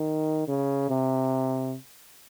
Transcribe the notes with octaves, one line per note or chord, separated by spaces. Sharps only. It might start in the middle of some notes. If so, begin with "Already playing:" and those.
Already playing: D#3
C#3
C3